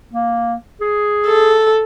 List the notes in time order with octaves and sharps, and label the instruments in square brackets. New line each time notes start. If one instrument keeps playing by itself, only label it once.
[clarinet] A#3
G#4
[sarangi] A4